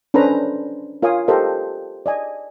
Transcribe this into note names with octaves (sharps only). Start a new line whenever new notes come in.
C#4 D4 A4 B4 C5 A#5
F4 A#4 C#5 F5 G#5 D#6
G4 A4 A#4 C5 D#5
D5 D#5 G#5